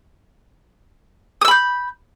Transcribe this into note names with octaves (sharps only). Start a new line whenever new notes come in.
B5 D#6 E6 G6